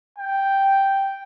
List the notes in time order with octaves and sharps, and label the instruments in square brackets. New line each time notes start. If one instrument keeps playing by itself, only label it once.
[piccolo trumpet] G5